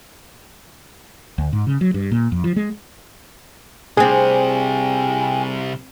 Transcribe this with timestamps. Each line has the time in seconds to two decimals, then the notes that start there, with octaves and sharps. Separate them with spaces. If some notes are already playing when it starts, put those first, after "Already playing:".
1.38 D2
1.53 G#2
1.67 C#3
1.81 F#3
1.94 G2
2.11 A#2
2.32 F2
2.44 F3
2.56 G#3
3.97 C3 G3 C4 D4 G#4 G5 G#5